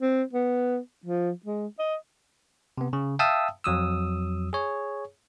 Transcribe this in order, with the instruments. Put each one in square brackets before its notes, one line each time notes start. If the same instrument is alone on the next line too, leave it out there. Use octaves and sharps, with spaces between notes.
[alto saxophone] C4
B3
F3
G#3
D#5
[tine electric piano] C3 B3
C#3
E5 F5 G5 A5 D#6 E6
F2 F#3 D#6 E6
G#4 C#5